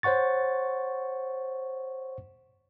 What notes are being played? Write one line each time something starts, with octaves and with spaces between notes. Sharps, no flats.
C5 C#5 F#5 C#6 A6